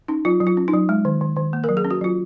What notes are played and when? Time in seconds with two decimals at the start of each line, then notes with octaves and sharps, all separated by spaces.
0.08 C#4 D#4
0.25 F#3 F4
0.41 F#3
0.47 F4
0.57 C#4
0.68 D#4
0.73 F#3
0.89 G#3
1.05 D#3
1.21 D#3
1.36 D#3
1.53 A#3
1.64 A#4
1.69 F#3
1.77 G#4
1.85 C#4
1.91 F#4
2.01 F#3 F4